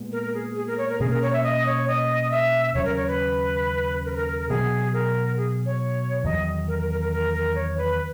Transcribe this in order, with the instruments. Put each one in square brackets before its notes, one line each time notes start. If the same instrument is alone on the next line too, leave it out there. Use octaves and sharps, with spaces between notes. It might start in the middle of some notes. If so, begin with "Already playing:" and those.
Already playing: [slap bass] A#2 G#3 B3
[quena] A#4
A#4
G#4
G#4
A#4
C#5
A#4
[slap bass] B2 A#3 C#4 [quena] G#4
[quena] A#4
C#5
E5
D#5
C#5
D#5
E5
[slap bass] D#2 C#3 F#3 C#4 [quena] C#5
[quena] A#4
C#5
B4
A#4
B4
A#4
A#4
A#4
[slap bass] B2 F#3 B3 [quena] G#4
[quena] A#4
G#4
C#5
[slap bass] E2 D#3 F#3 [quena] D#5
[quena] A#4
A#4
A#4
A#4
A#4
A#4
C#5
B4